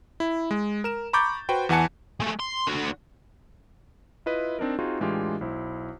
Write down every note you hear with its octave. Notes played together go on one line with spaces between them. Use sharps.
E4
G#3
A#4 E7
A#5 B5 C#6 D6 G6 A6
F#4 B4 C5 G5
E2 E3 F#5 G#5 A5 C#7
G#3 A3
C6
D3 F#4
E4 F4 B4 D#5 E5
C4 D4 D#4 A#4
C4 D#4 F4 F#4 G#4
A2 E3 G#3 D4 F4 G4
B1 E4 C5